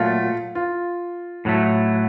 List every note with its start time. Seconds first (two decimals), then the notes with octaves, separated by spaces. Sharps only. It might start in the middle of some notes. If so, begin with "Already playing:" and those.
Already playing: A#2 F#3 A3 F4
0.55 F4
1.45 A2 F#3 A3